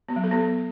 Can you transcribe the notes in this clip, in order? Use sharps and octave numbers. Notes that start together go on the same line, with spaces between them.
B3
F#3
A4
B3